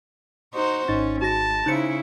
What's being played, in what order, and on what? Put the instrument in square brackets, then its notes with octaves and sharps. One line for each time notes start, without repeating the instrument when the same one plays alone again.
[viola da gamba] D#4 F#4 C5
[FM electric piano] G#1 D#4 A6 [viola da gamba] C#4
[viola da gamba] G#3 [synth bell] F#4 A#6 [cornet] A5
[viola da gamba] C#3 E4 [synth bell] D#4 C#7 [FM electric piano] C5 G#5 F#6